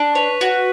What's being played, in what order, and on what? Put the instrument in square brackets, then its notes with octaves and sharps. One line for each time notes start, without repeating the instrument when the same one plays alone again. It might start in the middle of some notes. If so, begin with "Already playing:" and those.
Already playing: [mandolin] D4
[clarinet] B4 [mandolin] C#5
[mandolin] F#4